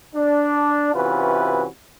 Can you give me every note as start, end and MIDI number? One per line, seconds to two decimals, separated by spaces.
0.15 0.93 62
0.94 1.66 48
0.94 1.66 52
0.94 1.66 61
0.94 1.66 65
0.94 1.66 66
0.94 1.66 71